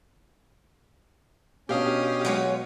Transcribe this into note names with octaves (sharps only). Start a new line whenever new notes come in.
B2 C#4 D4 G4 F5 D#6
F#3 G#3 C#5